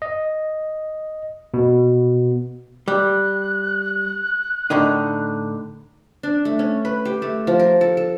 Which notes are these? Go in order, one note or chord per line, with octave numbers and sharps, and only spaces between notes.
D#5
B2
G3 F#6
A2 D3 D#4
D4
A3
C#4
B4
G4
A3
F3
A#4
A4
A4